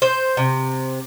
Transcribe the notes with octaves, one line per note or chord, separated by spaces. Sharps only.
C5
C3